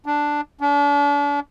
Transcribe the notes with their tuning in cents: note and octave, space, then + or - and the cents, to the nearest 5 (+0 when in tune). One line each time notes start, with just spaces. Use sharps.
D4 +0
D4 -40